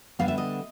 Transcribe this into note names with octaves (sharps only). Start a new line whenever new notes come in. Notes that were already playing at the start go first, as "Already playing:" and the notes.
D3 G3 B3 F5
E5
D#5